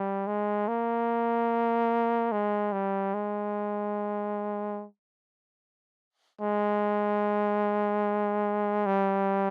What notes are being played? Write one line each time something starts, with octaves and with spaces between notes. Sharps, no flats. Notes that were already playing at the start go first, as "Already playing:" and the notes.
Already playing: G3
G#3
A#3
G#3
G3
G#3
G#3
G3